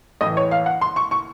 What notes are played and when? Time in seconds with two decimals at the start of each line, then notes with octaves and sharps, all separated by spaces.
0.21 A2 E3 D#5
0.37 C#5
0.51 F5
0.66 F#5
0.81 C6
0.96 C#6
1.11 C#6